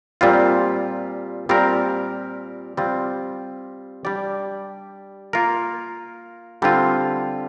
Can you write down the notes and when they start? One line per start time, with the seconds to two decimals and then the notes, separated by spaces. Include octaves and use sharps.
0.21 A#2 G3 C4 F4
1.49 A#2 G3 C4 G4 A#4
2.77 G3 C4 F4
4.05 G3 D4 G4 D5
5.33 A#3 F4 A#4
6.62 D3 G3 C4 F4